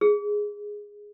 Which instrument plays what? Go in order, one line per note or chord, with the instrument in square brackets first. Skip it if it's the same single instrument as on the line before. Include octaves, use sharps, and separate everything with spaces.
[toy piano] G#4